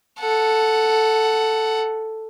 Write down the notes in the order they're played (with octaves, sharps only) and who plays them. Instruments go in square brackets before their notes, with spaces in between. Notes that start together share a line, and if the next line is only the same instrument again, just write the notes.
[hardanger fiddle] A4 F#5